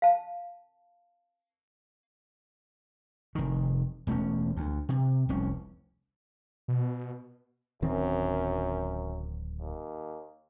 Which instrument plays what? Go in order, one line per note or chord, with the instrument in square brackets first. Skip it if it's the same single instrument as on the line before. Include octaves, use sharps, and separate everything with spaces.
[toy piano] F5 A5
[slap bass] F1 D#3
E1 A3 C4 C#4
D2
C3
F1 C2 C#4
[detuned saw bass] B2
[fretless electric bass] D1 D#3 C4 [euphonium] F#2
[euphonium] D#2